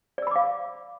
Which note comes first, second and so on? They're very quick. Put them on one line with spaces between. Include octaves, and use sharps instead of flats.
D5 E6 B5 D6 F5